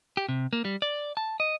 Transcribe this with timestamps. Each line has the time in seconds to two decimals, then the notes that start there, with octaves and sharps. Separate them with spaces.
0.17 G4
0.29 C3
0.53 A#3
0.65 G3
0.82 D5
1.17 A5
1.40 D#5